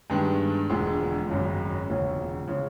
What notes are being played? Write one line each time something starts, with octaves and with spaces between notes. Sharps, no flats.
G2 D#3 G#3 B3 D4
E1 D2 D3 F3 G#3
G#1 F#2 C#3
E1 D2 C#3 F3
C#3 F3 G#3